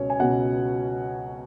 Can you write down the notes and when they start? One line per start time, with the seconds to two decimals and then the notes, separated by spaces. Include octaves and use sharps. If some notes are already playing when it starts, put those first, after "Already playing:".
Already playing: C#2 B2 F#3 C#4 C#5
0.10 G#5
0.19 C#2 B2 F#3 F#4 F#5